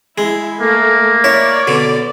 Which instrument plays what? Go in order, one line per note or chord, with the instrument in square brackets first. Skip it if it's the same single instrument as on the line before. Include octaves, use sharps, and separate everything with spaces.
[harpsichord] G#3 [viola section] E4
[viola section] A3 [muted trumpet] A#3
[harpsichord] E4 [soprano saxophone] C#5 [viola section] D5
[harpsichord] B2 D3